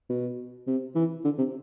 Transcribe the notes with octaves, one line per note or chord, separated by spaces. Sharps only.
B2
C3
E3
D3
C3